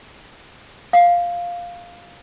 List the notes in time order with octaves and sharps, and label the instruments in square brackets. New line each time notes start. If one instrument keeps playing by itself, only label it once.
[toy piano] F5